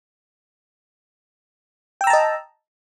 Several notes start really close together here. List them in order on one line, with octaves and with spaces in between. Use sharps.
G5 E6 A#5 A5 D#5